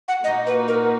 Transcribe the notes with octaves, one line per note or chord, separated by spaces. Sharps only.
F#5
A#2 A#3 D#4 F#4 D#5
B4
A#4